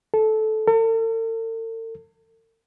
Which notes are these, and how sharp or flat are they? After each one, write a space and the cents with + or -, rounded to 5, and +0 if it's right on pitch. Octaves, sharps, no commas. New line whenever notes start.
A4 -15
A4 +45